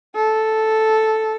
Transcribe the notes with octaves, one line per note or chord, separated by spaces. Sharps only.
A4